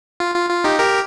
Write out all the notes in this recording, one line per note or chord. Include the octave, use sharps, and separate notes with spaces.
F4
F4
F4
D#4 G4
G4 A#4